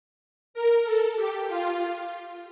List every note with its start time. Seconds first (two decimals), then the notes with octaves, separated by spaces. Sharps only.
0.54 A#4
0.84 A4
1.16 G4
1.48 F4